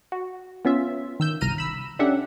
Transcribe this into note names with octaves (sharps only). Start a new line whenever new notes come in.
F#4
B3 C#4 F4 E5
D#3 E6 G6
G1 C2 A#5 F6 D#7
B5 E6
C#4 D4 G4 A4 E5 F#5